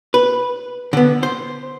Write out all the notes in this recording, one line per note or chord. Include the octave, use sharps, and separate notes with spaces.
B4
D3 B3
C5